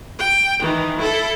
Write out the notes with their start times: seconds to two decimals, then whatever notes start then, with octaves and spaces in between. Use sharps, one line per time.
0.19 G5
0.61 D#3 E3
0.99 E4 A4